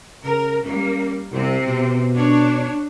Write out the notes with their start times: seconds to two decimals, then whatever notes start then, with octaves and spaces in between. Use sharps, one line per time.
0.24 C#3 A#4
0.65 G3 A#3 C#4
1.31 C2 C3 C4
1.65 B2
2.16 D4 C#5